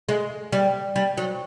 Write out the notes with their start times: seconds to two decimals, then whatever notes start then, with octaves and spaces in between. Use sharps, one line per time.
0.09 G#3
0.52 G3
0.96 G3
1.18 F#3